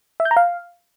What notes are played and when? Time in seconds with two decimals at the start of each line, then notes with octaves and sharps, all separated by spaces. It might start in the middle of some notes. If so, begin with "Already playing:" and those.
0.20 E5
0.25 G6
0.31 A#5
0.37 F5